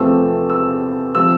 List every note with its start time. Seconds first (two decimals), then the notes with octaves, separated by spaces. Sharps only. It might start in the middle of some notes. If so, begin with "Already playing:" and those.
Already playing: E2 C3 F3 A3 C4 E6
0.50 E6
1.15 C3 F3 E6